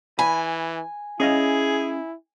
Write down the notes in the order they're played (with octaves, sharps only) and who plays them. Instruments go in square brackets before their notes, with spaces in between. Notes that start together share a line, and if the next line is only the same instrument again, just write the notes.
[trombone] E3 [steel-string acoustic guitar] G#5 [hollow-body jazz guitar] B5
[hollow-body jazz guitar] C#4 D#5 F5 [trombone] E4 [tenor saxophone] G#4